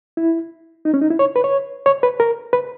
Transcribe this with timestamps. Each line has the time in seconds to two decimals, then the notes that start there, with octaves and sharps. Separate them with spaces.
0.17 E4
0.85 D#4
0.94 C#4
1.01 D#4
1.10 E4
1.19 C#5
1.36 B4
1.44 C#5
1.86 C#5
2.03 B4
2.20 A#4
2.53 B4